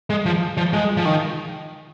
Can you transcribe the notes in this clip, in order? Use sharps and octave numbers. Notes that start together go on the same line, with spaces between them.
G#3
F3
F3
G#3
F3
D#3